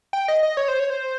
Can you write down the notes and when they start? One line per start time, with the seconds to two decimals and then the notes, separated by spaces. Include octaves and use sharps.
0.13 G5
0.28 D#5
0.43 D#5
0.57 C#5
0.68 C5
0.79 C#5
0.90 C5